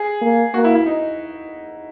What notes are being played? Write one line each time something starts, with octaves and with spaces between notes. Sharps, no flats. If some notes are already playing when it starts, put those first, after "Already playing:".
Already playing: G#4
A#3
A#3 F#4
E4
E4
D#4